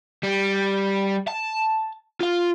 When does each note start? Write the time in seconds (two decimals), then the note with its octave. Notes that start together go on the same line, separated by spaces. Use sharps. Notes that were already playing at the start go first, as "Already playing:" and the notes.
0.23 G3
1.28 A5
2.21 F4 F5